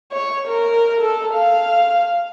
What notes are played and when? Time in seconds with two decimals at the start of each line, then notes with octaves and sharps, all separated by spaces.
0.12 C#5
0.48 A#4
1.01 A4
1.35 F5